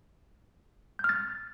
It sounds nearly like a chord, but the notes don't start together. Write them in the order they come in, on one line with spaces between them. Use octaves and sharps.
G6 F6 A6